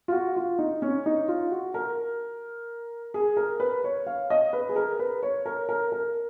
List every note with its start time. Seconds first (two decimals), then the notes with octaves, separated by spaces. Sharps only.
0.08 F4
0.12 F#4
0.36 F4
0.59 D#4
0.82 C#4
1.06 D#4
1.28 F4
1.51 F#4
1.74 A#4
3.14 G#4
3.37 A#4
3.60 B4
3.84 C#5
4.06 F5
4.30 D#5
4.53 B4
4.69 G#4
4.76 A#4
4.99 B4
5.23 C#5
5.46 A#4
5.69 A#4
5.92 A#4